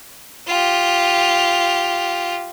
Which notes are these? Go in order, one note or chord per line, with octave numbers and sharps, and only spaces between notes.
F4 G4